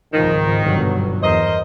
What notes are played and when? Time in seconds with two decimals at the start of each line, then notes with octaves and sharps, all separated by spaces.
0.13 G#1 C#2 D#3 F3
0.61 G1 B2 F#3
1.22 E2 A#4 C5 D#5